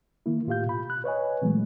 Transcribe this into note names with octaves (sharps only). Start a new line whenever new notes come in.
D#3 A#3 E4
A2 F4 G4 F5 G6
B2 B5
F#6
B4 C#5 D#5 G#5
A#2 E3 F#3 G#3 A3 B3